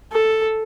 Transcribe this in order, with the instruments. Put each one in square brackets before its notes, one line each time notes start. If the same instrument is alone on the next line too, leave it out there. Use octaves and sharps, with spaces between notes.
[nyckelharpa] A4